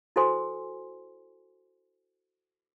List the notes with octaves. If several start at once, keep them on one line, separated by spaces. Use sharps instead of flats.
E4 F#4 A4 C5 G#5 C6